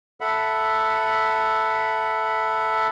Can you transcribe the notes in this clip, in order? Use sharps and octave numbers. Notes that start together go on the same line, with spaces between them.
A4 E5 F#5 B5